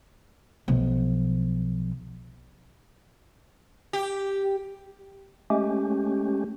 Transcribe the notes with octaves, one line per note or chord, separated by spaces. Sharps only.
B1 F3
G4
G#3 A3 C#4 G4